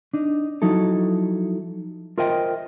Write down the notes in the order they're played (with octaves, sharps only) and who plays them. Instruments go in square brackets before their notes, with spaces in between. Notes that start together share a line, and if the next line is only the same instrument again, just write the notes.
[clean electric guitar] D4 D#4
F3 F#3 D#4 E4 A4
F4 A#4 C5 D#5 E5 G5